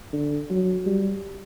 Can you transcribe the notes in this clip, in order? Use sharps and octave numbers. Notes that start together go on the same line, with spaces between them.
D3
F#3
G3